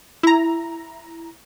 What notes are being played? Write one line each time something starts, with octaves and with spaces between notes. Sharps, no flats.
E4 A#5